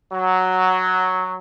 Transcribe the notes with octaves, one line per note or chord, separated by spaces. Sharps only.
F#3